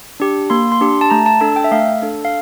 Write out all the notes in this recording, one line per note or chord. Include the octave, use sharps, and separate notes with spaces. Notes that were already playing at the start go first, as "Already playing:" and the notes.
D4 G4
A#3 C6
C6
D4 G4
A5
A3 A#5
A5
D4 A4 A5
G5
E5
A3 F5
D4 A4
F5